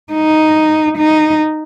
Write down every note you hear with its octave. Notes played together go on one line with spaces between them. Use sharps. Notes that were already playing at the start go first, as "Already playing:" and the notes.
D#4
D#4